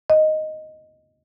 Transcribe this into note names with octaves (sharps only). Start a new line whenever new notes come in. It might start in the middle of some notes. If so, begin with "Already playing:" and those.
D#5